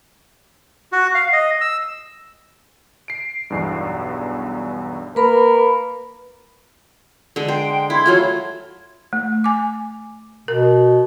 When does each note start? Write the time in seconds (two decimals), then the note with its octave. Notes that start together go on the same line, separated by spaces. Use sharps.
0.92 F#4
1.15 F5
1.33 D#5
1.61 E6
3.08 C7 D7
3.50 B1 E2 G2
5.16 A#3 A#4 B4 B5
7.36 D3 G#3
7.48 C5 G5
7.90 E4 C6 G#6
8.06 F#3 A3 F4
9.13 A3
9.44 G#5 D6
10.48 B2 A#4